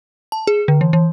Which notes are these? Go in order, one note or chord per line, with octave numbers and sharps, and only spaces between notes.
A5
G#4
D3
E3
E3